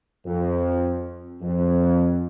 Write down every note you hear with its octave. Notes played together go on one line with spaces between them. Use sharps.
F2
F2